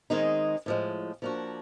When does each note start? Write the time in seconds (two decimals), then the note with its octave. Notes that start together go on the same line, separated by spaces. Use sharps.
0.10 D#3 G#3 C4 D#4 G#4
0.66 A2 F3 G#3
1.22 F3 A#3 D4 F#4